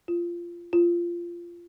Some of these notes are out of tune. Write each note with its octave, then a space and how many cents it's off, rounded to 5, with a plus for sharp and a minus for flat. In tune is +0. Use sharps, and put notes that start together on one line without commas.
F4 -15
F4 -15